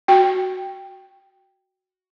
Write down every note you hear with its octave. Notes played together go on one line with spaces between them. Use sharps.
F#4 G5